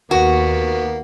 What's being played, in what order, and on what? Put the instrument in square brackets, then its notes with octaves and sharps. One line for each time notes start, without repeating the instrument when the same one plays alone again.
[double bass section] D#2 [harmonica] A#3 B3 [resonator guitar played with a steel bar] F#4